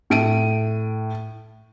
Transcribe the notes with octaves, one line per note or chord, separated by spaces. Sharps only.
A2 D7 D#7